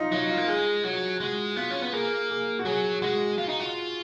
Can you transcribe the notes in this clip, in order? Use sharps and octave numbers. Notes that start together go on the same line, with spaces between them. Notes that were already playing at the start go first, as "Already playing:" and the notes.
Already playing: D#4 F4
F#3 D#4
F4
A#3
G#3 G#4
F#3 F#4
G#3 F#4
B3 F4
C#4
B3
A#3 G#4
G#4
F#4
F#3 G#4
G#3 F#4
F4
D#4
F4